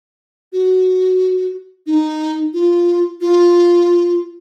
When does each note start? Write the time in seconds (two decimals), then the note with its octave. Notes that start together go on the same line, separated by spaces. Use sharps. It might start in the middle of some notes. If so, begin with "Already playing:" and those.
0.53 F#4
1.87 D#4
2.53 F4
3.21 F4